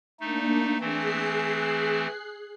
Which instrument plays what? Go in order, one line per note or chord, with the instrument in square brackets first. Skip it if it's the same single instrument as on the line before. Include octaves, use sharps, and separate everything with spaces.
[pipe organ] A3 D#4 [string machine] A#3 D4
[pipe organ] E3 A3 C4 [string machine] G#4 F#6 C7